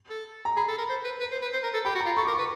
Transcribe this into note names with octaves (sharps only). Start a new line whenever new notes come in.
A4
A#5
G#4 B5
A4
A#4
C5
B4
B4
C5
B4
C5
A#4
A4
G4 B5
F#4
A#5
F4
A4 C#6
A#4 D6
C#6
B4